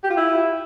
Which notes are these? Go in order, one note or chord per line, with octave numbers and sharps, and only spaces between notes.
G4
F4
E4